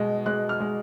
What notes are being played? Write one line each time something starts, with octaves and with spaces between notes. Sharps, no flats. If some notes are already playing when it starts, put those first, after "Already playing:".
Already playing: B2 G#3
G#3 F#6
F6
G#3